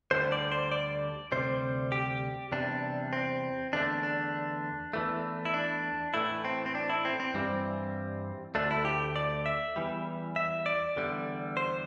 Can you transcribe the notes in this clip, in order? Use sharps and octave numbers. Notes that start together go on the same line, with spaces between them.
D2 D3 G3 C5
D5
C5
D5
D2 C3 G3 C5
G4
E2 C3 G3 D4
C4
E2 D3 A3 D4
D4
E2 E3 A3
E4
D4
A2 E3 A3 E4
C4
C4
D4
E4
C4
C4
G2 E3 G3 C4
D2 D3 A3 D4
E4
G4
D5
E5
E2 E3 G3
E5
D5
E2 D3 G3
C5